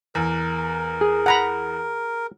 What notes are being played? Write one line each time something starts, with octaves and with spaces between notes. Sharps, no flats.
E2 A#4
G#4
F#5 A#5 B5